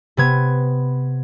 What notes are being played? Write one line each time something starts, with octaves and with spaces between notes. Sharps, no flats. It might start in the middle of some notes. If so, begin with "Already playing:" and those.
C3 B3 G#6